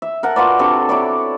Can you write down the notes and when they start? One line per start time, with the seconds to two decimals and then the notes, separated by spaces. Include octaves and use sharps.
0.02 E5
0.23 A#4 F#5 A5
0.36 F4 F#4 B4 D5
0.59 C3 D4 F#4 A4
0.89 E4 C#5 D5 D6